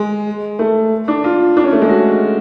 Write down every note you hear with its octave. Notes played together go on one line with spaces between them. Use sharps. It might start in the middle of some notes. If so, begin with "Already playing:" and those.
Already playing: G#3
A3
D4
F4
D4
C#4
A3
G#3
F#4